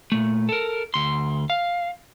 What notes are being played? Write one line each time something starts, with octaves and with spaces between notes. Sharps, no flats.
A#2 A3
A4 A#4
D2 C6
F5